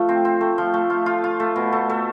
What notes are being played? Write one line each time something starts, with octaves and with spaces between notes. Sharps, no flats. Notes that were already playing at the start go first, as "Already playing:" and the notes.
Already playing: F3 A3 F4
C4
C4
A3
F3
A3
F4
F4
F4
A3
B2
A3
A3